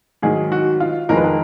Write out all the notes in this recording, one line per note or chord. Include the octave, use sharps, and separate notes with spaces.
G#2 D#3 F#3 G#4
F#4
F4
F2 D#3 G#3 A#4
B4
A#4